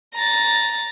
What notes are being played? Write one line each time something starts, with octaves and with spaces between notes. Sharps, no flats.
A#5 A6